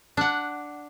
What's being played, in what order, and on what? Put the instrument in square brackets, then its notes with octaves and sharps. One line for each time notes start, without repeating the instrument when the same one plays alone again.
[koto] D4 F#5